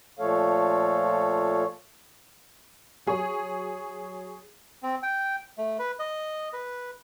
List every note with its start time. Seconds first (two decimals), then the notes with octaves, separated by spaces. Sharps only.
0.19 A#2 F3 A3 A4 C#5 F5
3.06 F#3 G#4 C#5
4.83 C4
5.03 G5
5.58 A3
5.79 B4
5.99 D#5
6.53 B4